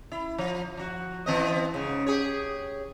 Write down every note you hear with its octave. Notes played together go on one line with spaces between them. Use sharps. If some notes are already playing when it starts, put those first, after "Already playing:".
E4
F3
F3 F#4
E3 C4 D#5
G#2 C#3
G4 G#4 C#5